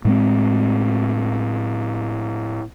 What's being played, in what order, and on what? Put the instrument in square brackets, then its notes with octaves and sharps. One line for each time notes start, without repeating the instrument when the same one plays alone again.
[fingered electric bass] A2 G#3 C4